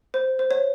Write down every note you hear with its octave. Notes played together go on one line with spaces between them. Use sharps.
C5
C5
C#5